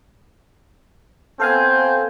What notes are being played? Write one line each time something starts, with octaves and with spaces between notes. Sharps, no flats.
B3 C4 A4 F5 G#5 G6